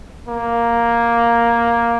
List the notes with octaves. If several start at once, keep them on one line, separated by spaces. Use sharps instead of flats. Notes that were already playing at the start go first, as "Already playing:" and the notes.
A#3